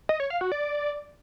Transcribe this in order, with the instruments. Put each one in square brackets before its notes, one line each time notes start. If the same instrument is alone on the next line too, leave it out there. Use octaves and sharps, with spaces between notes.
[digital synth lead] D#5
C#5
F5
F#4
D5